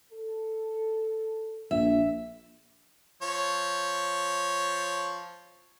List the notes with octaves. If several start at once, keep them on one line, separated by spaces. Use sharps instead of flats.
A4
A#1 E5
F3 C#5